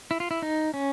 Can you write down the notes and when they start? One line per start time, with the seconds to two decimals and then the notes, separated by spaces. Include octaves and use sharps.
0.11 E4
0.20 F4
0.31 E4
0.42 D#4
0.74 C#4